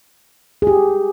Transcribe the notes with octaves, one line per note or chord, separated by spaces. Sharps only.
G#4
G4